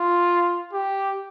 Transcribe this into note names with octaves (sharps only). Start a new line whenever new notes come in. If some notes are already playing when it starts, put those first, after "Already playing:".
Already playing: F4
G4